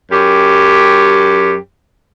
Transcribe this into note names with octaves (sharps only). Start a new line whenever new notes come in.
F#2 G4